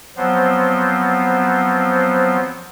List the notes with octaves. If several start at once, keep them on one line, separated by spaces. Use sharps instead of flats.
F3 F#3 B3 C4 C5